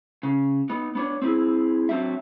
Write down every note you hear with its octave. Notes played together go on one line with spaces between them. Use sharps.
C#3
B3 D#4
B3 D4 C#5
C4 E4 G#4
F#3 C4 D4 E5